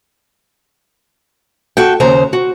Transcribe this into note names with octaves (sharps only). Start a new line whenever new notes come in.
F#4 A4 G5
D#2 C#3 C5 A#5
F#4